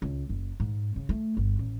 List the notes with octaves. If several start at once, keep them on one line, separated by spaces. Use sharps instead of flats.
C#2
F#1
G#2
C#3
A3
G1
A1